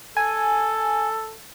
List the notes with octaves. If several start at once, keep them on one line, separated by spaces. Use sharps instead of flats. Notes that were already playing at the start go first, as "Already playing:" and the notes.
A4 G#5